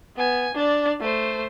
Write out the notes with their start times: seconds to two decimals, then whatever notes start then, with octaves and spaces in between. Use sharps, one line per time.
0.16 B3 G#5
0.54 D4 D5
1.00 A3 C5